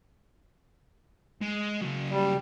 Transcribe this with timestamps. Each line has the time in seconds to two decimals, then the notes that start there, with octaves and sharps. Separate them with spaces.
1.42 G#3
1.81 C#3 F#3
2.10 G3